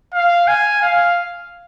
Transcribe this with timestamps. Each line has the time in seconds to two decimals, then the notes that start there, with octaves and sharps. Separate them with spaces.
0.14 F5
0.48 G#5
0.82 F5